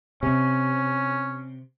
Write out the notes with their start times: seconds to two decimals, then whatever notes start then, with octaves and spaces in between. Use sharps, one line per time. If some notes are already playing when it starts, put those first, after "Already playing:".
0.23 C3 C#4